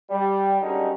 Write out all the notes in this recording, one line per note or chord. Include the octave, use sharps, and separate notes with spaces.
G3
F#2 D3 G3 G#3 C#4 D#4